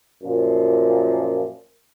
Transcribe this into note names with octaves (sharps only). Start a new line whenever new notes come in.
F#2 A#2 F3